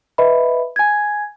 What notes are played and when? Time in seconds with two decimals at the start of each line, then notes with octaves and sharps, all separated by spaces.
0.18 B4 D#5 E5 B5
0.76 G#5 G#6